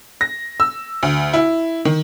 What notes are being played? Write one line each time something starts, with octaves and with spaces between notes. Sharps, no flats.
A#6
E6
D2
E4
D#3